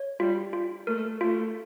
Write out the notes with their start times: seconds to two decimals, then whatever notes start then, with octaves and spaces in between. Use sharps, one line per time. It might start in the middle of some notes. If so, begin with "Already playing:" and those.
Already playing: C#5
0.20 G3 F4
0.53 F4
0.87 A3 A#4
1.21 A3 F4